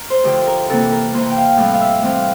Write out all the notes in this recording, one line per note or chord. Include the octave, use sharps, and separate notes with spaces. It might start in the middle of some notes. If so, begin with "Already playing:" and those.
Already playing: A#4
C5
D2 D3 F3 G4
A#4
C3 E3 A#3 A4
A#4
C3 E3 A#3 C5
G5
F5
A2 E3 G3 C4 F5
F5
E5
A2 E3 G3 C4 F5